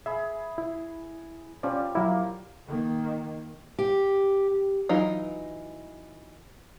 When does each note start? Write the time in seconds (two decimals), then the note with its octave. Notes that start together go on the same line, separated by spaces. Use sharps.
0.06 G#4 E5 B5
0.58 E4
1.63 F3 G3 C#4 D5
1.95 F#3 A#3 E4
2.68 D#3 A#3
3.79 G4
4.89 E3 F#3 D#4 F4